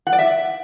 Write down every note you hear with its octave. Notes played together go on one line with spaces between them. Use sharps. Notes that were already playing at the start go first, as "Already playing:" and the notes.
F#5
D5
E5